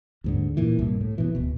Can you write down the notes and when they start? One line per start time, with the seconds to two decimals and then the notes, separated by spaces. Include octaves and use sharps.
0.24 D#2 G#2 D3
0.57 A#2 E3
0.79 C2 G2 A#2
1.01 A2
1.18 B2 E3
1.35 D1 B2